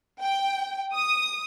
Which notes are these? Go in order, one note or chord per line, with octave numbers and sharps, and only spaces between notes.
G5
D#6